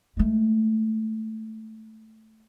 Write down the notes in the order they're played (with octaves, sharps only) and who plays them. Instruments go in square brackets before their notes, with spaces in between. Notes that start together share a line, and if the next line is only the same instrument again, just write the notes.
[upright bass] G#3 A3